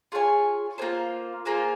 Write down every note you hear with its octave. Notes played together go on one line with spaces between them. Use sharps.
F4 G#4 C#5 G#5
A#3 F4 G#4 C5
A#3 F4 G#4 C5